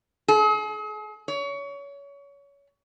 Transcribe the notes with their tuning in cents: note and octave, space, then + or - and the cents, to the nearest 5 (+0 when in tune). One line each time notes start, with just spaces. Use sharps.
G#4 +40
C#5 +25